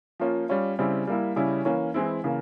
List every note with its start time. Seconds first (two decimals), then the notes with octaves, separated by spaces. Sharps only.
0.20 F3 A#3 C#4 F4
0.49 G3 C#4 F4
0.79 C#3 G3 C4 E4
1.07 G3 A#3 E4
1.36 C#3 G3 C#4 E4
1.65 E3 A#3 C#4
1.94 E3 G#3 C4 E4
2.24 C#3 E3 A#3